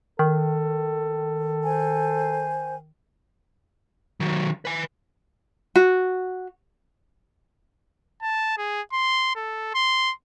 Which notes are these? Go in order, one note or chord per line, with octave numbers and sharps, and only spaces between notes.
D#3 A4
C5 G#5
D#3 F#3
B4 G#5
F#4
A5
G#4
C6
A4
C6